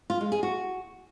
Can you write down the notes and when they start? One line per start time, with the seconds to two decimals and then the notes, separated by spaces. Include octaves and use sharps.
0.10 F4
0.21 G#3
0.32 G#4
0.43 F#4